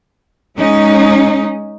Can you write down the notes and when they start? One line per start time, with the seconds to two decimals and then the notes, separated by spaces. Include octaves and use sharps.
0.57 G#3 C#4 D#4